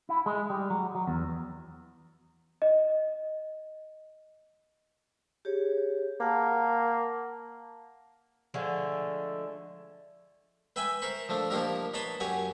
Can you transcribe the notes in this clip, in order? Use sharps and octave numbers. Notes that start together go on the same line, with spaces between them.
E4
G#3
G3
F#3
F#3
E2
D#5
G4 G#4 C#5
A#3 F#5 A5
D3 F3 G#3 A3
B4 E5 G5 G#5 B5
A#4 C5 B5 C#6
F3 A3 D4
F3 A#3 D4 D#4 G4 A#4
D#4 B4 C#5 A5 B5 C6
F#2 G4 C#5 F#5 G#5